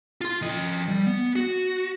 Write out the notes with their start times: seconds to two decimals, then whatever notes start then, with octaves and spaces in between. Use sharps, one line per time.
0.21 F4 C6
0.42 F3 D#5
0.88 G3
1.06 B3
1.36 F#4